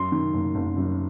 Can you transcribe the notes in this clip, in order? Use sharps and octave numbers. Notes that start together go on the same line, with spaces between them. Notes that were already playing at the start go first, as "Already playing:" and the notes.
Already playing: F#2 C6
D#3
F#1
F#1
F#2